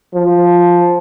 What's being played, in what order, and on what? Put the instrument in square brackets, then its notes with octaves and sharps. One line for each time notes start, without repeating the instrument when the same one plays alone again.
[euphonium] F3